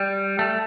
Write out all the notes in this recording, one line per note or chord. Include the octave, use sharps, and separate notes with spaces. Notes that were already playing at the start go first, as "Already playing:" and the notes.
Already playing: G3
A3